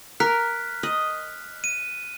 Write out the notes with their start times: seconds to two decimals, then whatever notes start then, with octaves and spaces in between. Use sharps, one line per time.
0.20 A#4 F6 F#6 B6
0.83 D#5
1.64 D#7